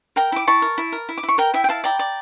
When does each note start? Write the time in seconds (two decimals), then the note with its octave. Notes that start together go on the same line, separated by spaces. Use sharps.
0.16 A#4 G5 A#5
0.32 E4 D6
0.47 E4 A5 C#6
0.62 A#4
0.78 E4
0.92 A#4
1.09 E4
1.18 D6
1.23 E4
1.29 C#6
1.38 A#4 G5 A#5
1.54 E4 E5 G5
1.64 G5
1.69 E4 F5 A5
1.84 D5 G5 A#5
1.99 D5